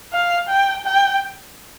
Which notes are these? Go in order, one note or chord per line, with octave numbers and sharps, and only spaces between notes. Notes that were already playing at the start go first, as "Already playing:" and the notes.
F5
G5
G5